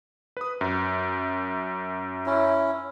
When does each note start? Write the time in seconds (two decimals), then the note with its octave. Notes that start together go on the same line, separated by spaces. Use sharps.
0.37 B4 D#6
0.61 F#2
2.26 C#4 E4